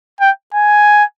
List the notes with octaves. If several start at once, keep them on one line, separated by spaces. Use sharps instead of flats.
G5
G#5